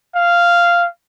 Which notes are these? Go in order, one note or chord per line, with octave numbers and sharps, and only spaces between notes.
F5